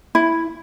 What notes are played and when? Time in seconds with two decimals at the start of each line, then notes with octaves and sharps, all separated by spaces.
0.15 E4